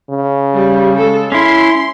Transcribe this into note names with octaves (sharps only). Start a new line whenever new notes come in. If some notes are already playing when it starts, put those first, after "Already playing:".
C#3
G3
G#3 A4
C#4 E4 C6